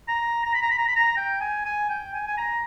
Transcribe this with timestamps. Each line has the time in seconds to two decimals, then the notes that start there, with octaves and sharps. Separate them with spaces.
0.08 A#5
0.45 A#5
0.54 B5
0.62 A#5
0.71 B5
0.78 A#5
0.88 B5
0.96 A#5
1.17 G5
1.41 G#5
1.65 G#5
1.89 G5
2.14 G#5
2.27 G#5
2.38 A#5